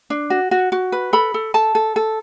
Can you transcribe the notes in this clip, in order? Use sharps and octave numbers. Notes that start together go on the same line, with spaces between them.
D4
F#4
F#4
F#4
B4
A4 B5
A4
A4 A5
A4
A4